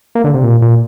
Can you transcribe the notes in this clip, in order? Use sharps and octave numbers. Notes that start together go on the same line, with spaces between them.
A#3
D3
C3
A#2
A#2